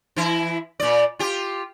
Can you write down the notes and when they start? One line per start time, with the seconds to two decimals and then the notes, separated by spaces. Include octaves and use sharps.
0.16 E3 E4
0.80 A#2 D5
1.19 F4 G4